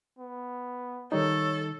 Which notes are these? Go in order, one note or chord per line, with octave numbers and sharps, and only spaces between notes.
B3
D#3 G3 D#4 A4 C#5